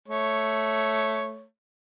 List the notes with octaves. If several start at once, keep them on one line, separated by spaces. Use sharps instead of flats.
A3 C#5